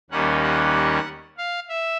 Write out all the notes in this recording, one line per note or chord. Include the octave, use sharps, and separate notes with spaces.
D#2 D#3 G3 A#3 C#4 F#5
F#5
F5
E5